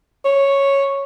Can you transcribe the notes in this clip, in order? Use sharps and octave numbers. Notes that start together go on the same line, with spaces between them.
C#5